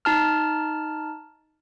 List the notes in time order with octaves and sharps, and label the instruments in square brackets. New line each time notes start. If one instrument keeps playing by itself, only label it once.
[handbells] D#4 A5 F6